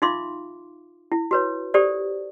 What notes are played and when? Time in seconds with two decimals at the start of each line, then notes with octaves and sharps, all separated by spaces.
0.02 D#4 F4 E5 F5 C6 D6
1.12 E4
1.31 F#4 B4 C#5
1.74 G4 A4 C5 D5